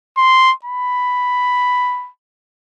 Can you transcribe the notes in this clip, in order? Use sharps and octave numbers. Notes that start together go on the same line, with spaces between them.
C6
B5